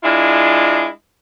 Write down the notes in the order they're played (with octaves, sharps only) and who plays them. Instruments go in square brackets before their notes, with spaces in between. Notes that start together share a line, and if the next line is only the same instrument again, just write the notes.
[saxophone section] G#3 D4 E4 F4